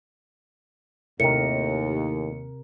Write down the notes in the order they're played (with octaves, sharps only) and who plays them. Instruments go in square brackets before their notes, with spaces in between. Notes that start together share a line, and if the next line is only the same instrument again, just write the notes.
[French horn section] D#2 [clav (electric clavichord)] A2 D#3 [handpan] C3 A#4 [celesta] C#7